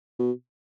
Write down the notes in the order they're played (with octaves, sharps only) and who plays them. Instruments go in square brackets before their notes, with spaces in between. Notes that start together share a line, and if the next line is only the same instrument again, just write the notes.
[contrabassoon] B2